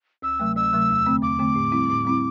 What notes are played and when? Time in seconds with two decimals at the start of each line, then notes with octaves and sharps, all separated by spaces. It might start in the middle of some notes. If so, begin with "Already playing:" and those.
0.22 D2 E6
0.40 C3 F#3 A3
0.56 D2 E6
0.73 C3 F#3 A3
0.89 E2
1.07 D3 A3 C4
1.23 E2 D6
1.39 D3 A3 C4
1.55 A2
1.72 G3 C4 E4
1.90 A2
2.05 G3 C4 E4